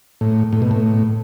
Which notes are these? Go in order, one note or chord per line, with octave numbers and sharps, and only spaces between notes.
A2
A2
B2
A2